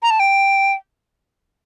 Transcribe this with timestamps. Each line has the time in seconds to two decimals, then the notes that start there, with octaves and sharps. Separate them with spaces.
0.03 A#5
0.10 A5
0.20 G5